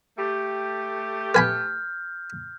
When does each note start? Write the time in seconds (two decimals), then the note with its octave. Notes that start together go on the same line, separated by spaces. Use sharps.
0.18 A3 G4
1.35 B4 G#5 B5 F6 G6